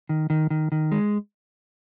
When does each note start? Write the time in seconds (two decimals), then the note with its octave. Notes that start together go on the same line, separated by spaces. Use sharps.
0.09 D#3
0.30 D#3
0.51 D#3
0.72 D#3
0.92 G#3